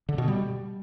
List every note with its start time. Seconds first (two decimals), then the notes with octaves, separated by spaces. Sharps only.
0.09 D3
0.18 B2
0.28 G3